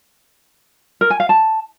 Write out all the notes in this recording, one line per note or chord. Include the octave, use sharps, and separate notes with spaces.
A#4
G#5
F5
A5